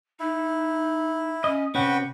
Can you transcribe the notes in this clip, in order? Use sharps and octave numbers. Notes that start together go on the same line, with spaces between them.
D#4 E4
C#4 D#5
C3 C#4 F#4 B4 F#5 G5